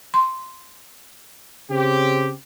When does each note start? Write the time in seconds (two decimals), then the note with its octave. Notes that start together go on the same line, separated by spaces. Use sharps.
0.14 C6
1.70 C#3 C4 G4